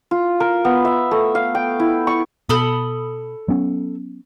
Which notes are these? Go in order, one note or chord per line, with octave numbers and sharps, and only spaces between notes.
F4
A#4
B3
E5
A3
F5
G5
E4
C#6
B2 A4 B5 D#6
F#3 B3 C#4